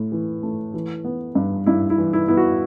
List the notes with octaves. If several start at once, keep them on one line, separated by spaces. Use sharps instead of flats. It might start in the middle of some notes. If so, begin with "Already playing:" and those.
Already playing: A2
E3
A3
E3
B3
G2
G2 E4
E4
E3
E4
B3 E4
F#4